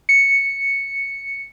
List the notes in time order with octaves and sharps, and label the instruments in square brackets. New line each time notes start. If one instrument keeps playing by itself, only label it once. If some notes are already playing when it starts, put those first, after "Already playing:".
[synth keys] C#7